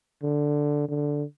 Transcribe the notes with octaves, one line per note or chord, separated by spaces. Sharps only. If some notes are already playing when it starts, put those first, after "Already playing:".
D3
D3